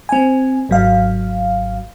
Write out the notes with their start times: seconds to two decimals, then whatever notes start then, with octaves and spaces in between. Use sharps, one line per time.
0.09 C4 G#5
0.69 G#1 F#3 F5